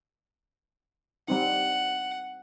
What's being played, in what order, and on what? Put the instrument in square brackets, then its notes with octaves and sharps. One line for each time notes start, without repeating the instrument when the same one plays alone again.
[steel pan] G3 C4 D#4 [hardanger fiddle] F#5